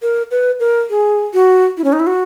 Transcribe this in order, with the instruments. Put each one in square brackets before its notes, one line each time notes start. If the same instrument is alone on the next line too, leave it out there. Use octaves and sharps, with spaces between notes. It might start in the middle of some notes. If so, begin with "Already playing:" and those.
[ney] A#4
B4
A#4
G#4
F#4
E4
C#4
D#4
E4
F#4